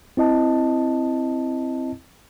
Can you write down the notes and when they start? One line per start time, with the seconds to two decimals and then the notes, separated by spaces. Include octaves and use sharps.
0.17 C4 E4 D#5 A5